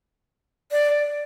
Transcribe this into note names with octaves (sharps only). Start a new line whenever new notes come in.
D5